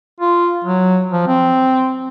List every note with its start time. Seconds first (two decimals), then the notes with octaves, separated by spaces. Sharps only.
0.20 F4
0.64 F#3
1.12 F3
1.28 C4